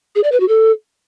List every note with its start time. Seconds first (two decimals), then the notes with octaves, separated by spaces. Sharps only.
0.15 G#4
0.24 D5
0.32 B4
0.40 F#4
0.48 A4